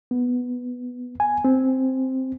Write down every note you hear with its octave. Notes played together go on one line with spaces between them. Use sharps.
B3
G#5
C4